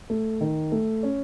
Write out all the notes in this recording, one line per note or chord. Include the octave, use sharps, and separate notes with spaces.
A3
D#3
A3
C#4